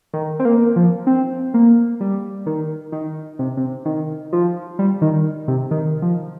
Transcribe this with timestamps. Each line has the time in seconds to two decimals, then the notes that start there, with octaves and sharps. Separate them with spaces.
0.13 D#3
0.39 C4
0.45 A#3
0.76 F3
1.07 C4
1.54 A#3
2.00 G3
2.46 D#3
2.92 D#3
3.39 C3
3.57 C3
3.85 D#3
4.33 F3
4.79 G3
5.02 D#3
5.48 C3
5.71 D#3
6.02 F3